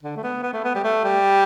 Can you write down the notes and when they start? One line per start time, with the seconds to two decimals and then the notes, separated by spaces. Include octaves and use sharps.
0.03 D3
0.16 A3
0.23 B3
0.43 B3
0.53 A3
0.64 B3
0.75 G3
0.84 A3
1.04 G3